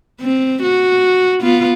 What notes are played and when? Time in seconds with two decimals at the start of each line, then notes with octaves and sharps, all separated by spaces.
0.21 C4
0.62 F#4
1.41 B3 F4